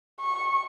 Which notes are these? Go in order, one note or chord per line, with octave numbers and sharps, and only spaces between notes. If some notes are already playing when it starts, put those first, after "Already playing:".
C#6